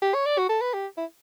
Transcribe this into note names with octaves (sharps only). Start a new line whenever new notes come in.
G4
C#5
D5
F#4
A4
B4
G4
E4